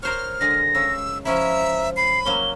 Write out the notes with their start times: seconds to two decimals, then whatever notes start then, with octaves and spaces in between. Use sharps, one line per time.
0.03 A#4 C5 C#5 F6
0.41 D3 G#3 A#6
0.75 C#3 E6
1.25 F3 C#4 E4 E5 A#5
1.97 B5 C7
2.25 F#3 A#3 C#4 G7